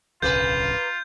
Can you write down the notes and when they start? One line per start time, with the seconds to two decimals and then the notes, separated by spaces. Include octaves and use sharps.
0.22 D1 B1 C#3 A#3 F4 B4 G6